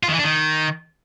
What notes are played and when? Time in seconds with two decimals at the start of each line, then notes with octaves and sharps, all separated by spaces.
0.03 F4
0.08 D#3
0.14 E3
0.19 D4
0.24 D#3